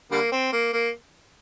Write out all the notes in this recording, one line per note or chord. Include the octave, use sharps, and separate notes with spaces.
D3 G3 A#3
C4
A#3
A#3